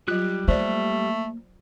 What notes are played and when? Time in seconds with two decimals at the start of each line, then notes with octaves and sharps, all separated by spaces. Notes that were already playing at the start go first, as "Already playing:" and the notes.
0.08 F#3 G3 F4 G4 F#6
0.48 A3 A#3 C5 D5